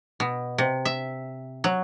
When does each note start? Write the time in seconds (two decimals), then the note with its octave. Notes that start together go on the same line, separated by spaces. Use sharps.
0.20 B2
0.58 C3
0.85 E5
1.64 F#3